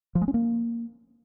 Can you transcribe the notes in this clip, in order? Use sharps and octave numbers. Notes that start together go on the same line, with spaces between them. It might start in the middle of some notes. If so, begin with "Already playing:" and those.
F3
G#3
C#4
A#3